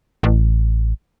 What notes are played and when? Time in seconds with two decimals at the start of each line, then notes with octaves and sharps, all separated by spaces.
0.23 A1